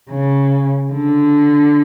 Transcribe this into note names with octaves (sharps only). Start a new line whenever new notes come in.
C#3
D3